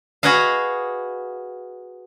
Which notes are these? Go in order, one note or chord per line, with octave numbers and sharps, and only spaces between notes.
F#4 G#4 B4 D#5 F5